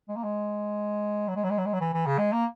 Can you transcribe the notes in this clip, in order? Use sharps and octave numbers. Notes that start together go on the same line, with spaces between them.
G#3
A#3
G#3
F#3
G#3
F#3
G#3
F#3
G#3
F#3
E3
E3
C#3
G#3
A#3